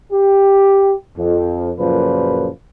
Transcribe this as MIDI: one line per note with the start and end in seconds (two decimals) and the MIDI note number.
0.12 0.94 67
1.18 1.71 41
1.79 2.48 42
1.79 2.48 46
1.79 2.48 49
1.79 2.48 53
1.79 2.48 54
1.79 2.48 71